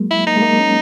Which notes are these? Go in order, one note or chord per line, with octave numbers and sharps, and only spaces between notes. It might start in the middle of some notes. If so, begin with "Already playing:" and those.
Already playing: F#3 G#3 A#3
E4
A#3 D#4
G#3
A#3
C#4